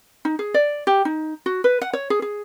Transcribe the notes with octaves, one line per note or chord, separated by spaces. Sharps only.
D#4
G#4
D5
G4
D#4
F#4
B4
F#5
C#5
G#4
G#4